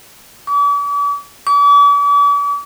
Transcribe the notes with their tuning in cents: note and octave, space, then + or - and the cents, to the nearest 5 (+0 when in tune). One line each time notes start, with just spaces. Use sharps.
D6 -45
D6 -45